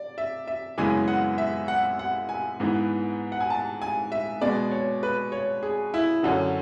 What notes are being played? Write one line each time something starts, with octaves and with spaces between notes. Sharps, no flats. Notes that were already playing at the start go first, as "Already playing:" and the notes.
Already playing: D5
E5
E5
F#2 C#3 E3 G#3 B3 G#5
F#5
E5
F#5
F#5
G#5
G#2 E3 B3
F#5
G#5
A5
G#5
E5
B2 G#3 B3 D5
C#5
B4
C#5
G#4
E4
F#2 D3 F#3 C#4